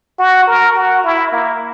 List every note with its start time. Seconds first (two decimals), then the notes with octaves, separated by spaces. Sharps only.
0.19 F#4
0.47 A#4
0.76 F#4
1.04 E4
1.32 A#3